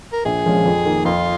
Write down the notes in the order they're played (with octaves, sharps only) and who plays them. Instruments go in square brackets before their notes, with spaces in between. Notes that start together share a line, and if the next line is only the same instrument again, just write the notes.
[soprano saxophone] A#4
[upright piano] A#1 [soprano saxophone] G#4
[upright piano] A#2 F3 G#3 C#4
F2
D#3 A#3
[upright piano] F2 [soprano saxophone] F4